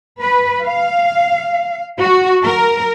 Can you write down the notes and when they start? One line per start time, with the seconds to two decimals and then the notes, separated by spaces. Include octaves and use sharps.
0.21 B4
0.66 F5
2.00 F#4
2.45 A#4